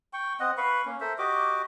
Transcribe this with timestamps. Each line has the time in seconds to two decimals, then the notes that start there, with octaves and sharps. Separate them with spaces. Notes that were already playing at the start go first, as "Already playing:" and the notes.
0.13 G5 C#6
0.40 C4 D#5 F#5
0.57 B4 F5 B5 C#6
0.86 A#3 C#4
1.00 A4 A#4 C5 E5
1.18 F#4 G4 D#5 D6